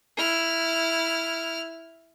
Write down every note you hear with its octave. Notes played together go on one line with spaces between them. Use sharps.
E4 F6